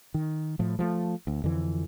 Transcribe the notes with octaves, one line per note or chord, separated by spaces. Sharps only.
D#3
A2 F3
F3 F#3 A3
D2
F2 D3 E3